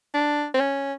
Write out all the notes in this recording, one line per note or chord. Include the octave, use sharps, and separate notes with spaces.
D4
C4
C#4